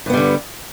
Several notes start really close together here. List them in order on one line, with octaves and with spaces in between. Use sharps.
G2 B3 G3 D3